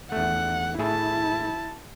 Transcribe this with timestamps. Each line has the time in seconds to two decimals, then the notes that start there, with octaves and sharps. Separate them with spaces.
0.12 E2 A3 F#5
0.79 A2 E4 G#4 E5 A5